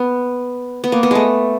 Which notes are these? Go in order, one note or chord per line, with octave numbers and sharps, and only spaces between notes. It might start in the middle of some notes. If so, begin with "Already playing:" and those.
Already playing: B3
B3
A#3
B3
G#3 A3